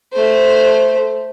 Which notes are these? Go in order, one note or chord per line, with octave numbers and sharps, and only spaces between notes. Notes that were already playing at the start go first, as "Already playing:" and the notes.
A3 C5